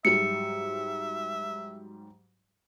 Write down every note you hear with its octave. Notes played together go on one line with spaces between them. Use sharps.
G#2 F#3 G3 E5 C#7